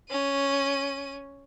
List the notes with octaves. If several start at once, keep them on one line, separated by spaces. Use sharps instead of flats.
C#4 D#7